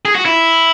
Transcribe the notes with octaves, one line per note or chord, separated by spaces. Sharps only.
G#4
F#4
E4